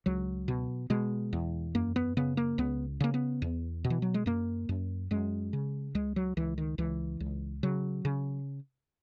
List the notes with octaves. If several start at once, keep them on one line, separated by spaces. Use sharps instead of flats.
C#2 F#3
B2
B2 G#3
E2
F#2 A#3
B3
C#3 B3
A#3
C#2 B3
C#3 A#3
B3
E2
B2
E3
F#3
G#3
F#2 A#3
F#2
F#2 G#3
C#3
C#2 G#3
F#3
C#2 E3
D#3
C#2 E3
C#2
C#3 F#3
C#3